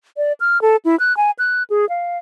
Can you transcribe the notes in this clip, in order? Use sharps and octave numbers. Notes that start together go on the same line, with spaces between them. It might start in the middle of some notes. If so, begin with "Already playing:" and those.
D5
F6
A4
E4
F#6
G#5
F#6
G#4
F5